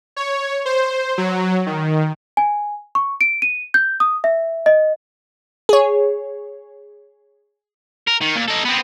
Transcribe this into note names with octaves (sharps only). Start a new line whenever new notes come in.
C#5
C5
F#3
D#3
G#5
C#6
D7
D#7
G6
D#6
E5
D#5
G#4 C#5
A#4
D#3
A#2
D#4 A4
B3 C4